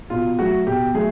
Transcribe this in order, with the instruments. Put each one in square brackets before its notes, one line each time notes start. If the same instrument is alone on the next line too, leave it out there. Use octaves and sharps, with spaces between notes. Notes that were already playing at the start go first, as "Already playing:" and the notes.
[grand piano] B2 F4
F#3 A3 F#4
B2 G4
F#3 A3 G#4